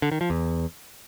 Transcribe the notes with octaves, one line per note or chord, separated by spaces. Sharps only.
D3
D#3
F3
E2